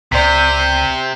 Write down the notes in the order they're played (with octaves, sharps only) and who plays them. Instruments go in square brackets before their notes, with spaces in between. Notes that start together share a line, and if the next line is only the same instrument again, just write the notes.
[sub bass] C#2 [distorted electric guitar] C3 [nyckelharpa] C5 [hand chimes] D5 B6